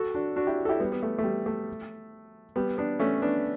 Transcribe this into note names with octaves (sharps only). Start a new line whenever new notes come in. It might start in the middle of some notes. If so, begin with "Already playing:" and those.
Already playing: F#4 A4
D4 F#4
D4 F#4
E4 G4
A4
E4 G4
G3 B3
B3
A3
A3
G3
A3
G3 B3
B3 D4
A3 C#4
B3 D4